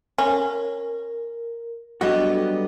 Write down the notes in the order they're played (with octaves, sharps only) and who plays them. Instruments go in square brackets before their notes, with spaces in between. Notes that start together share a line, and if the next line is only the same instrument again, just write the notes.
[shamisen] C#4 [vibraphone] A#4
[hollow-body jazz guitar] F#3 G3 F#4 [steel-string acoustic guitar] B3 D#5 [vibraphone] D4 A4